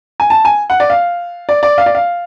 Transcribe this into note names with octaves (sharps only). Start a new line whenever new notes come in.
G#5
A5
G#5
F#5
D5
F5
D5
D5
F5
D5
F5